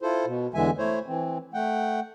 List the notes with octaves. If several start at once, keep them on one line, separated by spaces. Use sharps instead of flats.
E4 F4 A4 C5
B2
E2 D3 E3 G#3 E5 G#5
A3 E4 C5 C#5
E3 C4
A3 F#5 G5